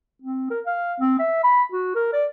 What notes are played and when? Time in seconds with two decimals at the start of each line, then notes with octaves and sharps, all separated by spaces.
0.22 C4
0.50 A#4
0.66 F5
1.00 C4
1.19 E5
1.43 B5
1.72 F#4
1.95 A#4
2.13 D5